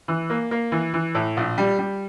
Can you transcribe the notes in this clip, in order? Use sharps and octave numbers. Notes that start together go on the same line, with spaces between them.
E3
A#3
A#3
E3
E3
A2
A#1
G3
G3